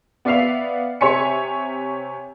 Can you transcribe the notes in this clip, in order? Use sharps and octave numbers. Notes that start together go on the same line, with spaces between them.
B3 D5 E5 F5 C7 F7
C3 C#5 E5 G#5 B6 C#7